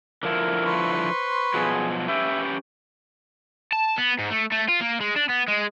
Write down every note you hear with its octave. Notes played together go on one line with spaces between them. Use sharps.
D3 F3 E4 A#4
B4 C6 C#6
C5
B2 F3 F#3 G#4
C#4 G4 B4 E5
A5
B3
G#2
A3
A3
F4
A#3
G#3
D4
B3
G#3